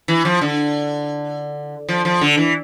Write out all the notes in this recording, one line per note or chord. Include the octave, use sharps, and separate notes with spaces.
E3
F3
D3
F3
F3
D3
E3